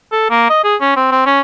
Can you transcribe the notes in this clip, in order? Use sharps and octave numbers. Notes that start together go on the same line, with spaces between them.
A4
A#3
D#5
G#4
C#4
C4
C4
C#4